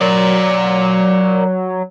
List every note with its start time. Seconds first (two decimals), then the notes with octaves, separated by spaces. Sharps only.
0.01 F#3 A#4 D5